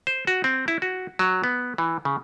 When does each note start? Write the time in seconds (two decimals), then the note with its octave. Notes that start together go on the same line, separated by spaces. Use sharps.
0.07 C5
0.27 F#4
0.44 C4
0.68 E4
0.82 F#4
1.19 F#3
1.44 B3
1.78 E3
2.05 C#3